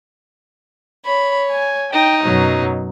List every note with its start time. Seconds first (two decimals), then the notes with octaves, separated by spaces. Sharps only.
1.05 C#5 B5
1.51 G#5
1.92 D#4 G5
2.23 F#2 B2 F#3